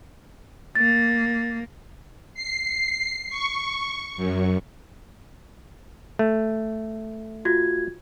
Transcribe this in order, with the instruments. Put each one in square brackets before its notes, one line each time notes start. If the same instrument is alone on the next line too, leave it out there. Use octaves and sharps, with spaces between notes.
[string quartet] A#3 [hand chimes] A6
[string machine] C7
C#6
F#2
[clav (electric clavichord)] A3
[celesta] F4 F#4 G#6